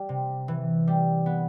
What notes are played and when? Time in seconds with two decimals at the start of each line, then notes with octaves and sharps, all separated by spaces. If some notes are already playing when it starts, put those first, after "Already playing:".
Already playing: G3
0.09 C3
0.48 E3
0.87 G3
1.26 B3